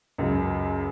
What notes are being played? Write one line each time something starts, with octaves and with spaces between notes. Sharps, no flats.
C#2 F#2